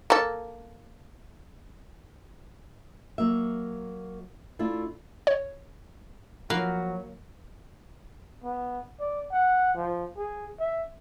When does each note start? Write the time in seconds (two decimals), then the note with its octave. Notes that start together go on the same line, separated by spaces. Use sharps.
0.10 A#3 A4
3.18 F#3 A#3 E5
4.59 A3 D4 E4 F4
5.27 C#5
6.50 F3 F#3 A#3 F#4 B4 F5
8.44 B3
9.00 D5
9.32 F#5
9.77 F3
10.17 G#4
10.60 E5